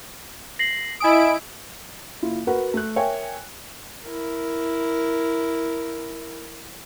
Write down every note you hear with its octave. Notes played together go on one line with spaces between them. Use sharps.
A#6 C7 F#7
E4 D#5 G#5 D#6 D7
F#1 E4 F4
F#4 A#4 B4 F#5
A3 F#6
A#4 C#5 E5 G5 G#5
E4 A#4